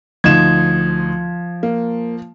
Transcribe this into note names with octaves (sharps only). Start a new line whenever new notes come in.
D2 F3 D#4 G#6 E7
A#3